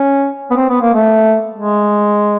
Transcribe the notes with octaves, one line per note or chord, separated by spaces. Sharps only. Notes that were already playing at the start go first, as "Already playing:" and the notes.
Already playing: C#4
B3
C4
B3
A#3
A3
G#3